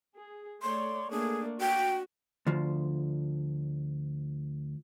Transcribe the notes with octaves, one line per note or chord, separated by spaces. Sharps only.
G#4
A3 C#5 D5 C6
A3 A#3 D4 G#4
F#4 G5
D2 F3